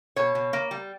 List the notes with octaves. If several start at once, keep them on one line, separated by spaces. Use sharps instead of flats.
B2 C#5
B2
A#3
G3